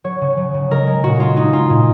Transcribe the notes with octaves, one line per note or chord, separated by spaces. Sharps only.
F#3 C#5
C#3
F#3
C#3
G#3 A#4
G#3
A#2 F#4
G#3 F4
G#3 D#4
G#3 F4
A#2